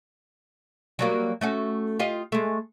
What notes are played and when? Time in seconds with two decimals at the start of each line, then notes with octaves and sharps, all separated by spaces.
0.99 F#3 G3 A#3
1.41 A3 C#4 F#4
1.99 F4 G4 D#5
2.32 G#3 A3